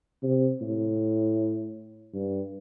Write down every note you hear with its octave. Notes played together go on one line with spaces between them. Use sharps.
C3
A2
G2